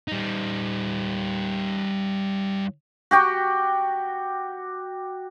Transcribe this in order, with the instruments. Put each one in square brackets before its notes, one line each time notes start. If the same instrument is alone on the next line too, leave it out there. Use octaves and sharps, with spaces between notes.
[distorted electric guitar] G3 D#4
[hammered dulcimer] F#4 G4 G5